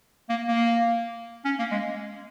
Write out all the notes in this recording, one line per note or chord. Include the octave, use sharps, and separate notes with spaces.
A#3
A#3
C#4
A#3
G#3